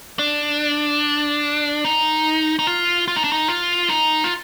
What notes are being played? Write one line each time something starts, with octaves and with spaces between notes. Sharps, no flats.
D4
D#4
D#4
F4
F4
D#4
D4
D#4
F4
D#4
F4